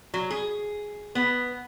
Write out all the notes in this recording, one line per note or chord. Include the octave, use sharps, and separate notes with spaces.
F#3
G#4
B3